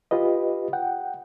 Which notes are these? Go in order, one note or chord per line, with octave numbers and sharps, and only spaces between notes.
F4 G4 B4 D#5
F#5 G5